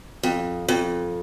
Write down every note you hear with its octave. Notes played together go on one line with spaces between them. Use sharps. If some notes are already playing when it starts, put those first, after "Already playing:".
F2
F2